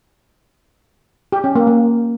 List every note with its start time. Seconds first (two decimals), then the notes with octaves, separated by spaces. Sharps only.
1.32 G4
1.44 C#4
1.55 A#3
1.67 A#3